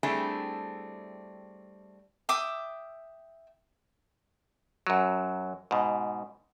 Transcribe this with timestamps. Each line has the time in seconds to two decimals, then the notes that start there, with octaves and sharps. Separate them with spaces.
0.03 G3 A3 C4 D4 E4 G#4
2.29 E5 G5 D6 D#6
4.87 F#2 F#3
5.71 G#2 B2